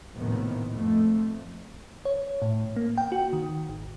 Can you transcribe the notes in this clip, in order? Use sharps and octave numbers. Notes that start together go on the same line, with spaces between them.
A#1 D#2 A2 C3 D#3 B3
F2 A3
C#5
A2
A#3
G5
F#4
D#3
G#1